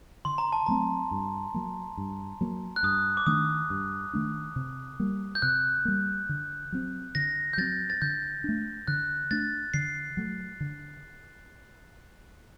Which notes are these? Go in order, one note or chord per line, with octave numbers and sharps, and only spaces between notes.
D3 C6
A#5
A5
F#3 A3 C4 A#5
G2
F#3 A#3
G2
F#3 A#3
F#6
G2 D#6
D6
D#3 A3 D4 D#6
G2
D#3 A3 D4
C3
G3 A#3
G6
C3 F#6
G3 A#3
D3
F#3 C4
D3 A#6
G6
F#3 C4 A6
A6
D3 G6
A3 D4
D3 F#6
A3 D4 A6
D3 C7
F#3 A3
D3